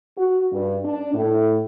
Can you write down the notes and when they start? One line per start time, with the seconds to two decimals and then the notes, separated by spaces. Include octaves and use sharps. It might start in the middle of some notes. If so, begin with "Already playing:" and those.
0.17 F#4
0.52 G2
0.85 D4
1.14 A2